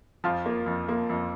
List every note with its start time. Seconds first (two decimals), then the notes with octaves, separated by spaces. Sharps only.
0.24 F2 F3 F4
0.46 A#3
0.66 F2
0.89 A#3
1.09 F2